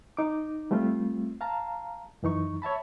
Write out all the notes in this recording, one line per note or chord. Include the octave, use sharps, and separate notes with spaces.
D#4 D6
G3 A3 C4 F4
F5 A5 A#5
F#2 E3 D#4 C#6
C#5 E5 A5 B5